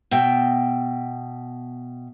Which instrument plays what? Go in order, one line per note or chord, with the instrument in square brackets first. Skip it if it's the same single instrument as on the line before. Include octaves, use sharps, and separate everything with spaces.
[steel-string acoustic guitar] B2 E5 G5